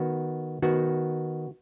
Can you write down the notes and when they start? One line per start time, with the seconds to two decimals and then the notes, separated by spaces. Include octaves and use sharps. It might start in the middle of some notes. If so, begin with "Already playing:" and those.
Already playing: D#3 B3 F#4
0.62 D#3 B3 F#4